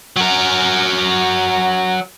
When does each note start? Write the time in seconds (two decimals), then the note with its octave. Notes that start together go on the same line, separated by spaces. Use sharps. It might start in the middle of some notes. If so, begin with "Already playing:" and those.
0.16 F#3 A#4